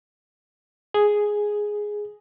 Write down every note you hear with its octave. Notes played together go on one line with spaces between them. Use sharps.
G#4